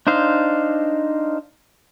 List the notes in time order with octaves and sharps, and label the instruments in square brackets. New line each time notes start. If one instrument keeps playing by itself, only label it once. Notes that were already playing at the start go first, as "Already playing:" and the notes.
[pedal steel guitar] D4 D#4 C5 F5